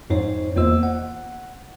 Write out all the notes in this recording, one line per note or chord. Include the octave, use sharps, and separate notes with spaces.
F2 G#2 D#4 C5 C#5
E2 A#3 F4 C5 D#5 E6
F#5